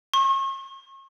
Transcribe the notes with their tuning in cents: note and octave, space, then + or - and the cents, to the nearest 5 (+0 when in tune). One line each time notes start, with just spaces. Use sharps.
C#6 -40